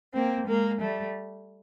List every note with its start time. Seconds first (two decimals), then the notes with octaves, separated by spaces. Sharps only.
0.14 A#3 C4
0.47 G#3 A#3
0.80 G3 A3